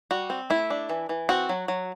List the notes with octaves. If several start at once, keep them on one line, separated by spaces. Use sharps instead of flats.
G3 F#4
C4
A3 E4
D4
E3
E3
C4 F#4
F#3
F#3